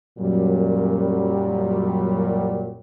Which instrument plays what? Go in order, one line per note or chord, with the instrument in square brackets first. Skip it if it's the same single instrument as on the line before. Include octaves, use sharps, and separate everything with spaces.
[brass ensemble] F#2 A#2 F#3 G3